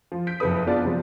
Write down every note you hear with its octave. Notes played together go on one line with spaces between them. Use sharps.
F3
G6 B6 D7
F#1 F2 C3 A4 B4 D#6
B3 D4 F4 G#4 D5 A5
C3 F3 F#3 G#3